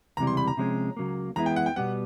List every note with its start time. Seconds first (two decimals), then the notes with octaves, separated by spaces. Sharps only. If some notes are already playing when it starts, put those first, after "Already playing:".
0.17 C#2 C3 E3 G3 A#5
0.27 C6
0.37 B5
0.48 A#5
0.57 C3 F3 G#3 C#4
0.97 C#2 C#3 F#3 A#3
1.36 E3 G#3 B3 E4 A#5
1.46 G5
1.56 F#5
1.66 G5
1.76 B2 G3 B3 F#5